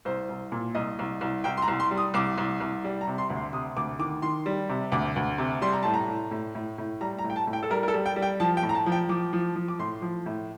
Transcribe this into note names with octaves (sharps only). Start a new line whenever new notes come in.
C2 C5
C2
A#2
C2 D#5
C2
C2
C2 G5
C6
A#5
C2
C6
G3
D#6
C2 D6
C2
C2
G3
A#5
C3
C6
D2
C6
C3 D#6
D2 D6
D#3 D6
D#3 C6
G3
C3
D2 D6
D2
C3
G3 C6
A#5
A2 A5
A#5
A2
A2
A2
A2
G3 A#5
A#5
A2
G5
A5
A2
G5
A4
G3 A#4
A#4
A4
G3
G5
G3
G5
F3 A5
G5
A2
A#5
A5
F3
G5
F3 D6
F3
F3
D6
A2 C6
F3
A2